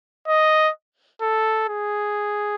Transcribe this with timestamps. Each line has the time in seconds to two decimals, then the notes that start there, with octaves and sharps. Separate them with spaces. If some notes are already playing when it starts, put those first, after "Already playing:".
0.28 D#5
1.22 A4
1.69 G#4